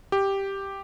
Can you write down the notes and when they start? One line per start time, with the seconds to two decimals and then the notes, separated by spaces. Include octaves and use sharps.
0.12 G4